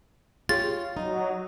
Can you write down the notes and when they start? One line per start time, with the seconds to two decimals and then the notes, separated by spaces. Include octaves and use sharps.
0.49 F4 G4 G#4 C#5 A6
0.97 F#3 D#4